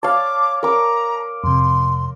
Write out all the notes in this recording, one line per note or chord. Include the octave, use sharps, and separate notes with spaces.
C#5 F5 A5 D6
A#4 A#5 D6
F2 C3 C6